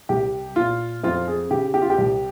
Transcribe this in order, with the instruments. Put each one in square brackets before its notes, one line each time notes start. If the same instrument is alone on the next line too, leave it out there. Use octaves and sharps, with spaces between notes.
[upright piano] C2 G4
A#2 F4
F2 F4
G#4
C#3 G4
G4
F4
G4
C2